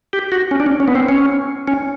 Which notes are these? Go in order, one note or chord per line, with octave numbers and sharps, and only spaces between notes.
G4
F#4
C#4
D4
C#4
C#4
B3
C4
C#4
C#4